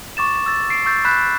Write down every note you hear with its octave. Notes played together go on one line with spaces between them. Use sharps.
C#6 D6 A6 E7
E6 A6
C7 D7
C#6 E6 G6 A6
B5 F#6 G6 B6 E7